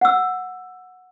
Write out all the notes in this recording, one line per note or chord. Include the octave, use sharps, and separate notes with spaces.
F#5 E6